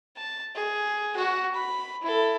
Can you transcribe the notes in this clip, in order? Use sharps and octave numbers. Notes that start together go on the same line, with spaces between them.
A5
G#4
F#4 F#5
B5
E4 A4